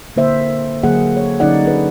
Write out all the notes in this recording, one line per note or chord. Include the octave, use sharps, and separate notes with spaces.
D3 A#3 C5 E5
D3 F#3 A#3 G#4 F#5
C#5
D3 F#3 C#4 D#4 D5 F#5
D4 G#4 B4